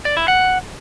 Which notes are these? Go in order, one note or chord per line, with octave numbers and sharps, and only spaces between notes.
D5
E4
F#5